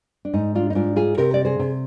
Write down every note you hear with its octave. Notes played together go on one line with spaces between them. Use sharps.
D4
G#2 D#4
D4 F4
D#4
G#2 D4 F4
F4 G#4
C3 G4 A#4
D5
G#4 C5
C3